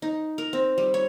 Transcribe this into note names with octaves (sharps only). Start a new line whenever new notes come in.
D#4
A#4
C4
G3
C#5